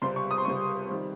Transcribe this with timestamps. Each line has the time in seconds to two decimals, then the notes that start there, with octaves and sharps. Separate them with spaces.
0.01 C#2 C3 G3 C4 C6
0.16 C#6
0.31 D#6
0.38 C6
0.45 C#2 C3 G3 C4 C#6
0.88 F2 D#3 G3